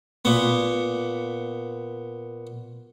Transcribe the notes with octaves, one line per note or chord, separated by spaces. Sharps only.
A#2 B3